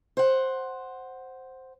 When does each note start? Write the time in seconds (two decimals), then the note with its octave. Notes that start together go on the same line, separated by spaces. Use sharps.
0.17 C5 F#5